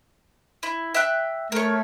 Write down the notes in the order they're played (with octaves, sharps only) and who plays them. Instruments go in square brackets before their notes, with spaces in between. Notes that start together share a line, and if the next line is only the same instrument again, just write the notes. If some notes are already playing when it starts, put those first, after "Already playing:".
[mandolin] E4
E5 G5 F#6
[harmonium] A3 [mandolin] A#4 C#5